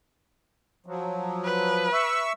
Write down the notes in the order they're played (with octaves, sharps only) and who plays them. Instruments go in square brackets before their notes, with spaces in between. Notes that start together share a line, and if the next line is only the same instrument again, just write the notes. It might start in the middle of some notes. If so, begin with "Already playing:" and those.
[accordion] F3 F#3
[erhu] B4
[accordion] E5 C#6 E6